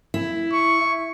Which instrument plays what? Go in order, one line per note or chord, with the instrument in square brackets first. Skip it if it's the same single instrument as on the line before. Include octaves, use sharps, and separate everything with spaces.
[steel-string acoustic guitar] E4
[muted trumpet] C#6